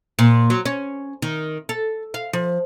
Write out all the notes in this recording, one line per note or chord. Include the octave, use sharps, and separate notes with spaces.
A#2
F#3
C#4
D#3
A4
F5
F3